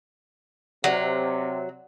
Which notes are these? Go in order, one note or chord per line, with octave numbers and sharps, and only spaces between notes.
C3 F#3 C5 D5 F#5